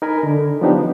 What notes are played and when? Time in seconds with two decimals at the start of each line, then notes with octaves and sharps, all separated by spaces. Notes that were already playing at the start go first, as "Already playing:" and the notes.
0.02 D#4 A#4 G#5 B5
0.23 D3
0.61 F3 F#3 B3 D4 D#4 G4